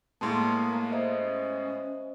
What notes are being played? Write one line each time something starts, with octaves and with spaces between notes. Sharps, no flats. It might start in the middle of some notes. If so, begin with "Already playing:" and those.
A2 G#3 A#3 B3 A5 C6
C5 D#5 E5
C#4